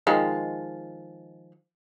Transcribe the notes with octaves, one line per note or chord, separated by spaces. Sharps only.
D#3 F3 G#3